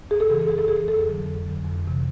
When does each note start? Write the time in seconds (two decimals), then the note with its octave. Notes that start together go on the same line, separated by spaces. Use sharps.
0.11 F#2 G#4
0.20 A4
0.29 C#3 E3 G#4
0.40 A4
0.48 F#2 G#4
0.58 A4
0.68 C#3 E3 G#4
0.88 F2 A4
1.08 D3 F#3
1.26 F2
1.46 D3 F#3
1.65 F2
1.85 C3 E3